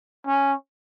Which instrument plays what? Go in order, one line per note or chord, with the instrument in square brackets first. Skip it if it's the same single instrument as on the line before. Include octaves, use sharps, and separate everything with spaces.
[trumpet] C#4